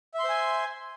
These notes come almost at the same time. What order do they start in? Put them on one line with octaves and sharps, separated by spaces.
E5 C6 C5 G#5